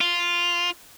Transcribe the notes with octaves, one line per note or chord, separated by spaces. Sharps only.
F4